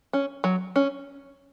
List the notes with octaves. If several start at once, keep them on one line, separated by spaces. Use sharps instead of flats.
C#4
F#3
C#4